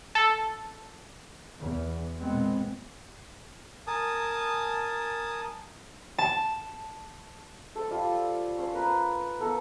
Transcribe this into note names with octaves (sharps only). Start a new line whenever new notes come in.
A4
E2
A#2 G#3 B3 C4
A#4 G#5 A5 D#6
A5
A4 C5
G3 F4
C#4 C5
A#4 B4 A#5
B3 A4 A#4